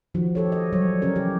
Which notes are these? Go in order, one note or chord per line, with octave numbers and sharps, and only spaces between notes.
D#3 F3 F#4
G4 A4 C#5
D#5
F#3 G3 C#5
C#3 E3 C#4 G4 A#4
E3 G4